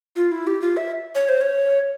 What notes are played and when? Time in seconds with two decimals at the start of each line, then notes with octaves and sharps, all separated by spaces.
0.16 F4
0.32 E4
0.47 G4
0.62 F4
0.77 E5
1.15 C#5
1.29 C5
1.41 C#5